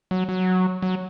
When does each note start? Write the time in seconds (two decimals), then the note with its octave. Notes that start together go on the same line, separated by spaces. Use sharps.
0.11 F#3
0.29 F#3
0.82 F#3